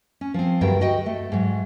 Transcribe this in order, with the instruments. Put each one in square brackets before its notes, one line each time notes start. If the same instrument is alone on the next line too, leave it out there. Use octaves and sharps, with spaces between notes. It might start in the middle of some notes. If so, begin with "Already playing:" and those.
[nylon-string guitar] C#4
F3 C4
D2 G2 F#3 G3 A#4 G5
F#4 D#5 G5
A3
G#2 F#3